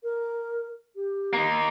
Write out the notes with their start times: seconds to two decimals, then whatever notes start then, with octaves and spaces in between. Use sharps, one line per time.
0.03 A#4
0.95 G4
1.33 A#3 D#4